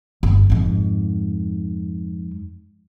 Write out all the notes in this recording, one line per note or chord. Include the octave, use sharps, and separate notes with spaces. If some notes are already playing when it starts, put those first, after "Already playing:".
G1
F2 G#2